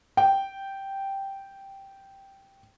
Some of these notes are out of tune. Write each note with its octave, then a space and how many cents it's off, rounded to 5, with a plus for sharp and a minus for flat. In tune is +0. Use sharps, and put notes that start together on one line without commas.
G5 -5